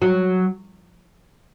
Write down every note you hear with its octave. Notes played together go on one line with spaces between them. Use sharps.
F#3